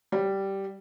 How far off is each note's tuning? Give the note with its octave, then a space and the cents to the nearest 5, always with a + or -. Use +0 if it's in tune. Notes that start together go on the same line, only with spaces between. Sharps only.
G3 -10